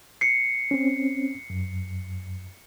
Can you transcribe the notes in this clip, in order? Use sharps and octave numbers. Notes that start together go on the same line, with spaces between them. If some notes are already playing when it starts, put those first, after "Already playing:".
C7 C#7
C4 C#4
F#2